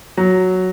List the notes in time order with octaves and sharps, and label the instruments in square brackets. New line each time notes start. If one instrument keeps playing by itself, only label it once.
[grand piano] F#3